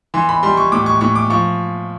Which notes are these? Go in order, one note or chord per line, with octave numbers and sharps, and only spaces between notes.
E3 C6
B5
G3 C6
C#6
A2 D6
C#6
A2 C#6
D6
F3 C#6